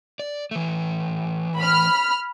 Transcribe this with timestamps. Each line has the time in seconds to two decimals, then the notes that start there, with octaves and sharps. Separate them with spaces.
0.19 D5
0.51 E3 A3
1.58 B5 F6